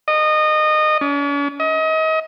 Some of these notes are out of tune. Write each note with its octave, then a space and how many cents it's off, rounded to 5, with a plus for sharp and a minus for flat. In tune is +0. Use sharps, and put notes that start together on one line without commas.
D#5 -20
C#4 +45
D#5 +35